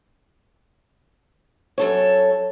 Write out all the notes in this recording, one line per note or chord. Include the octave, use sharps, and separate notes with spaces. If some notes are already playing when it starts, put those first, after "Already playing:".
F#2 A4 C#5